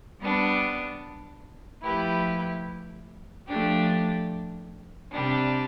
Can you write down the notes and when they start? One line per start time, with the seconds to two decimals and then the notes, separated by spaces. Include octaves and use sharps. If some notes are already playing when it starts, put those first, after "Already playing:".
0.20 G3 B3 D4
1.84 F3 A3 E4 G4 B4
3.47 F3 A3 D4 G4
5.11 C3 G3 D4